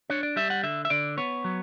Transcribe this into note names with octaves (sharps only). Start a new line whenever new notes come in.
D4 C#5
D5
G3 E5
F#5
D3 E5
E5
D3 D5
B3 C#5
F#3